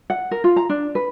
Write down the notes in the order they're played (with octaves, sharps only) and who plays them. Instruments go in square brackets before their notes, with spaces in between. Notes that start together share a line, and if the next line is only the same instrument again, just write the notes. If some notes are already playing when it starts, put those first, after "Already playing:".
[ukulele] F#5
A#4
F4
A#5
D4
B4